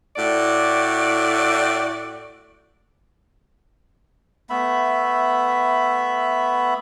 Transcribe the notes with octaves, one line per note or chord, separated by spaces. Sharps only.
A2 F#4 D5
A3 B3 E5 B5